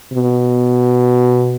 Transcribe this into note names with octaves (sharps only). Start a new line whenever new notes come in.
B2